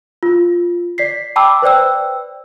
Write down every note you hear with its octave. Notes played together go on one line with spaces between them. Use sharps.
F4
D5 B6 C7
G5 A5 B5 D6 E6
B4 C5 D5 G5 E6